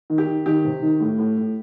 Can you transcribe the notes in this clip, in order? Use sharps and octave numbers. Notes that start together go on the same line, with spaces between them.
D#3
G4
D#3
D#3 G4
C3
D#3
A2
A2
A2